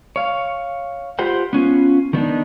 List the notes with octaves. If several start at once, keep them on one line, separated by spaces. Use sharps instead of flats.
C#5 F5
F4 G4 B4 C5 F#5 G5
B3 C#4 F4
D#3 B3 D4 D#4